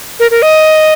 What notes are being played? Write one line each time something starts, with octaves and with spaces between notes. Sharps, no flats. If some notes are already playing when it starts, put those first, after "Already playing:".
A#4
A#4
D#5